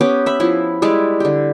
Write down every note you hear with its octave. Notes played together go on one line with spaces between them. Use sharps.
B3 C#4 G4 D6
E5 B5
F3 E4
G3 G#3 E4 D5
D3 G4